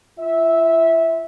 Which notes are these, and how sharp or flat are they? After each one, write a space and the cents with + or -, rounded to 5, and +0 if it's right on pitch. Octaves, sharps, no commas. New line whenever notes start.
F4 -45 E5 -10